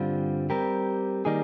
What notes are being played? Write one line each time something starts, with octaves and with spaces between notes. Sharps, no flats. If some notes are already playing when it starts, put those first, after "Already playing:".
Already playing: G2 D3 G3 C4 F4
G3 C4 G4 A#4
D#3 G3 A#3 D#4 G#4